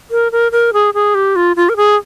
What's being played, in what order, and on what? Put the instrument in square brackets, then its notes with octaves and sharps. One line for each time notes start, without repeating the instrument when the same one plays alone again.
[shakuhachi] A#4
A#4
A#4
G#4
G#4
G4
F4
F4
A#4
G#4